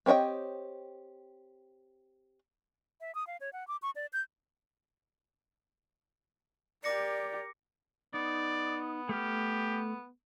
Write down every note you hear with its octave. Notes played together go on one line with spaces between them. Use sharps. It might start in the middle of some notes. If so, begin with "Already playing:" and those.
C4 G4 C#5 D#5 G5
E5
D#6
F5
C#5
F#5
D6
C#6
D5
G6
G4 A#4 D5 D6 A#6 C#7
B3 D#4 D5
A3 G4 F6